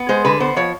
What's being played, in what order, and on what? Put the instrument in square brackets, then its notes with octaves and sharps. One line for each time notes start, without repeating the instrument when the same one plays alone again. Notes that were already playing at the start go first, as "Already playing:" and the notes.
Already playing: [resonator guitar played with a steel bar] B3
G#3 C5
D3 B4
B3 C5
F3 C#5